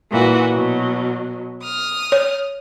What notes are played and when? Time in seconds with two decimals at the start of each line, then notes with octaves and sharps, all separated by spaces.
0.11 A#2 E3 F#4
0.52 B2 F#3
1.64 D#6 F6
2.12 C#5